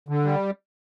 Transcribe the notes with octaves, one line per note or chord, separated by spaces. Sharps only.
D3
G3